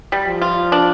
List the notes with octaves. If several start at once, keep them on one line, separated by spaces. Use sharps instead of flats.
G3
F3
F4
D4